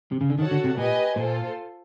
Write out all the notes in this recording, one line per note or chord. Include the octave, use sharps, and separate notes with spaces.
C3
C#3
D3
D#3 F#4 A4 C#5 F#5 A5
D3
C3
A#2 G4 B4 D#5 G#5
A#2 F4 A4 C5